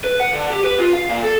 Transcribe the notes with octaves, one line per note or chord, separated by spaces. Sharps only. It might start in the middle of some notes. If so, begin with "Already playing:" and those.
B4
F#5
D3
G4
B4
F4
F5
A#2
A4